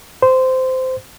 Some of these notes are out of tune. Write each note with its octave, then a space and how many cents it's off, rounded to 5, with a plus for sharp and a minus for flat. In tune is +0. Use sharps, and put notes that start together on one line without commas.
C5 -15